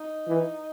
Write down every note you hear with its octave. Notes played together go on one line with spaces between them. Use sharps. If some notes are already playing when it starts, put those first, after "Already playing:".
Already playing: D#4
E3